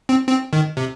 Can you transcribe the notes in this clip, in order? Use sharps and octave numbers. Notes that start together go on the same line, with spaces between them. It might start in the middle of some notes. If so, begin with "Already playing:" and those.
C4
C4
D#3
C3